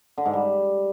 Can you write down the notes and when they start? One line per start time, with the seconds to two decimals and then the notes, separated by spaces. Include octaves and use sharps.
0.18 D3
0.25 G#2
0.33 G3